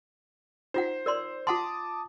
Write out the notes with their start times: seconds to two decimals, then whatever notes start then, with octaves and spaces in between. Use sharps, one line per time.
0.74 D#4 F4 C5 F#5
1.06 A#4 D5 C6
1.47 F4 F#5 A5 C6 D6 D#6